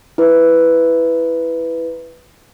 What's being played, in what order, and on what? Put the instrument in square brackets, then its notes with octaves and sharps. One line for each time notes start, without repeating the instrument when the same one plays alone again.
[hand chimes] E4 B4